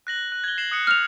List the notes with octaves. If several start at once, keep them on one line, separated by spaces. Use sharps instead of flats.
F#6 A#6 F#7
F#6
G#6 G7
C7 E7 F#7
D#6 F#6 C#7
F6 F7